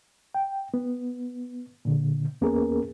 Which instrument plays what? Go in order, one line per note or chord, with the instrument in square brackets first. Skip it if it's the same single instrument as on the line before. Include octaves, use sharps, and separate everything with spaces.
[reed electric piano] G5
B3
A#2 D3
E2 A#3 B3 C#4 G#4 A#4